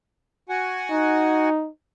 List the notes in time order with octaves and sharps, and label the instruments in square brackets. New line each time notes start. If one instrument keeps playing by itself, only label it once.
[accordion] F#4 F#5 G#5
[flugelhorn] D#4